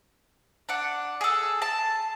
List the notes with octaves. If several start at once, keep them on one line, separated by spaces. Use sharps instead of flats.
D4 F#5
G#4 A4
A5